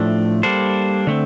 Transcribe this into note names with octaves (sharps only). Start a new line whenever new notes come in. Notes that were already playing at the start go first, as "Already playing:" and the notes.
Already playing: A2 F3 A3 D4
G3 A#3 D4 A4 C5
D3 A3 C4